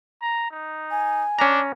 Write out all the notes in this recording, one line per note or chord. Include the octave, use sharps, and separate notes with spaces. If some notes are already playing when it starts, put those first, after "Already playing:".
A#5
D#4
G#5
C#4 D4 A#5